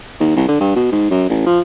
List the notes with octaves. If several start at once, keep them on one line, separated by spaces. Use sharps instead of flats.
D#2
C2
D3
G2
B2
G#2
F#2
A1
F3